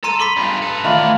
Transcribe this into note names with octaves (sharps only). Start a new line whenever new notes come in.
A4 A#5 C6 D#7
B5 C6 D6 B6
G2 F4
A4 B4
D#3 E3 A3 F4 D5